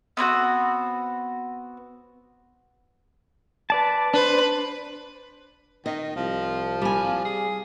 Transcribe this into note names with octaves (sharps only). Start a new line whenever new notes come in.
B3 C4 E4 F#4
B4 D5 A5
D4 B4 C5
D#3 D#5
C2 F3
G3 G#5
G#4